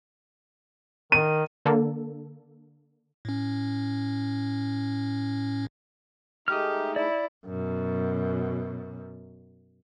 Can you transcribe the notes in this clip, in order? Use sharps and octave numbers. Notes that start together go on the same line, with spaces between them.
D#3 D#7
D3 A#3 A4
A2 C#4
G#3 A3 D#4 G4 D#6 F6
E4 D5
F#2 B2